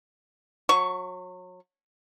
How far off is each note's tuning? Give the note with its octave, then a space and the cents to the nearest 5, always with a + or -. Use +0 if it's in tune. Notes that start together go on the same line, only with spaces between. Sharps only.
F#3 -30 C#6 +10